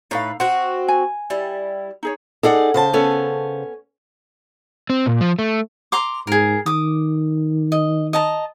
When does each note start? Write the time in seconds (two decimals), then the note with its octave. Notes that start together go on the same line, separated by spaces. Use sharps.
0.11 A2 D#4 B4 F5
0.40 C4 F#4 F#5
0.88 G#5
1.30 G3 E4
2.03 D#4 G#4 C#5
2.43 D#4 G#4 A4 D5 F#5
2.74 C#3 C5 A5
2.93 B3 C#4 A4
4.90 C4
5.06 A#2
5.21 F3
5.39 A3
5.92 A#5 C6 D6
6.27 G#2 G#4 A#4
6.66 D#3 D6 D#6
7.72 D#5
8.13 D#5 A5 A#5